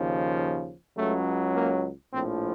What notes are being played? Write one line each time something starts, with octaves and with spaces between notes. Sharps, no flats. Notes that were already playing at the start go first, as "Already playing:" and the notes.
Already playing: D#2 C#3 F3
C#2 C#3 F#3 A3
A#3
A#1 A2 F3 C4